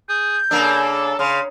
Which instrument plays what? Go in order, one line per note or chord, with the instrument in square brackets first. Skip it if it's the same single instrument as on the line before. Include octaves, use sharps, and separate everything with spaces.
[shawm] G#4 [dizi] G6
[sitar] C#3 A#3 D4 [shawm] A4
[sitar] C#3 [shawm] F5 [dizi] C6